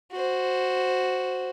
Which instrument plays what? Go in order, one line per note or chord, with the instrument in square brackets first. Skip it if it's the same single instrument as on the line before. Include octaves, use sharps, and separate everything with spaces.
[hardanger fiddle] F#4 C5